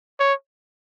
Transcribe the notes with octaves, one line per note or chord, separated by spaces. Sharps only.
C#5